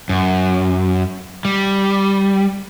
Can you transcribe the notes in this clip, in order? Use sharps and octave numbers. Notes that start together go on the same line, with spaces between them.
F#2
G3